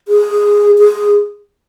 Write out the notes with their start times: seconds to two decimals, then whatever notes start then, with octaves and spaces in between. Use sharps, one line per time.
0.08 G#4
0.79 G#4